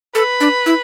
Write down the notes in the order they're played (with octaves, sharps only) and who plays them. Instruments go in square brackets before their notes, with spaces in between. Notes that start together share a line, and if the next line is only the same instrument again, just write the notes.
[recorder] A4 [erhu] B4
[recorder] D4
E4